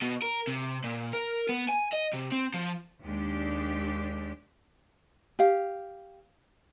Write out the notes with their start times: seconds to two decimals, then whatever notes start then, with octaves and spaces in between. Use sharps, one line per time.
0.02 B2
0.22 A#4
0.47 C3
0.84 A#2
1.13 A#4
1.49 B3
1.68 G#5
1.93 D#5
2.13 C3
2.32 C4
2.54 F3
3.03 D#2 G#3 D4 G4
5.39 G4 F5